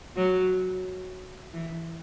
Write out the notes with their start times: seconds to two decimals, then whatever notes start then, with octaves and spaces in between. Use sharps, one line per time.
0.16 F#3
1.53 E3